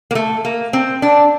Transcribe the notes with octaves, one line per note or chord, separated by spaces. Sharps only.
A#3
A3
A#3
C4
D4